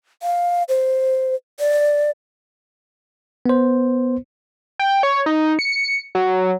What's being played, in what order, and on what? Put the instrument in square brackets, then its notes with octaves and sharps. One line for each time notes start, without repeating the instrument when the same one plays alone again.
[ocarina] F5
C5
D5
[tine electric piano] B3 C5
[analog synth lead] G5
C#5
D#4
C#7
F#3